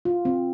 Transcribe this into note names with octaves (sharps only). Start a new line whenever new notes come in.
F4
C4